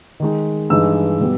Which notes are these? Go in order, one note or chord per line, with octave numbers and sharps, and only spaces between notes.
D#3 G#3 D#4
G2 E3 G#3 D#4 E6
B2 G3 B3